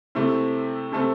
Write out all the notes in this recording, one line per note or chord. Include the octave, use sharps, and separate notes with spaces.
C3 A3 C4 E4
C3 A3 C4 A4